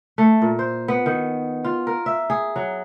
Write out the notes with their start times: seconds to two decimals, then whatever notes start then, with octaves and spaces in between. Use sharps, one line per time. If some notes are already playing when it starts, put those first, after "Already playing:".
0.18 A3
0.42 A#2
0.59 C5
0.88 B3
1.06 D#3
1.64 F4
1.87 A#4
2.06 E5
2.30 G#4
2.56 F#3